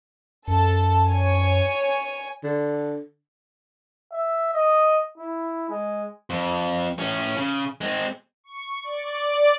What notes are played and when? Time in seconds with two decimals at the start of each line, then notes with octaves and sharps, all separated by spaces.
0.48 F#2 A4 A5
1.08 C#5 G#5
2.44 D3
4.12 E5
4.53 D#5
5.18 E4
5.70 G#3
6.30 F2
6.99 A2 C#4
7.36 C#3
7.81 G#3 C4
8.44 C#6
8.84 D5